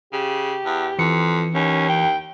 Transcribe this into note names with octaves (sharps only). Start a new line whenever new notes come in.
C#3 G4
E2
F2 E3 C#7
D#2 C#4
G5